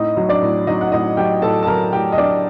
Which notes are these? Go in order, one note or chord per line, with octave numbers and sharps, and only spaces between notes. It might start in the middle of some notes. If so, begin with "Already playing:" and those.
Already playing: A2 D#4 D#5
F#3
D4 D5
A2
F#3 D#4 D#5
F#5
A2 D#4 D#5
F#3 G4 G5
A2 A4 A5
A5
F#3 A#4 A#5
A2 G4 G5
D#5
F#3 D4 D5